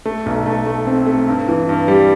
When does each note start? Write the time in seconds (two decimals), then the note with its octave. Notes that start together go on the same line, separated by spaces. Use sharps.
0.06 A3
0.26 B1
0.46 A3
0.66 A3
0.87 C4
1.07 A3
1.28 G2
1.48 E3
1.69 G2
1.88 G3